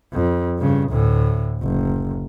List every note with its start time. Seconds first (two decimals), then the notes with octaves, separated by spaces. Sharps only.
0.13 F2
0.58 G2 C#3
0.89 D2 A2
1.62 F#1